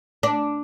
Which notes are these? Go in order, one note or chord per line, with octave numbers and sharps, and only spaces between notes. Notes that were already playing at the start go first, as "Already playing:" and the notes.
D4